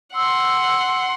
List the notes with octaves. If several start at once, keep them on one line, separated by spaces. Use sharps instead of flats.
F#5 C6 E6